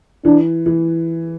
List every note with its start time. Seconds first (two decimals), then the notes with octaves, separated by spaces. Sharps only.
0.25 E3 D4
0.66 E3